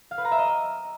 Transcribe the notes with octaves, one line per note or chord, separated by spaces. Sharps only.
F5
B4
A#5
E5
D#5